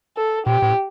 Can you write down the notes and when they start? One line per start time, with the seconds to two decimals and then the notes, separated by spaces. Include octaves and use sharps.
0.17 A4
0.46 A#2 G4
0.62 A2